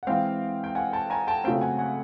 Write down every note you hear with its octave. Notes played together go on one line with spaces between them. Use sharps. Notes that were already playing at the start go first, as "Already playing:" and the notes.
F#5
E3 G#3 C4 F5 G5
G5
F#5 G#5
G5 A5
G#5 A#5
G5 A5
C#3 F#3 A3 C4 F5 G5
F#5 G#5
F#5 G#5